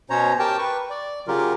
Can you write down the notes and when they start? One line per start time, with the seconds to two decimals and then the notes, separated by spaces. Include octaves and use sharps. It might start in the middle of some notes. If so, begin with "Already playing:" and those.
0.10 B2 C#4 C5 C#5 A#5
0.39 G4 A#4 G5 A5
0.58 B4 C#6
0.90 D5
1.28 C#3 F#3 F4 G4 A#4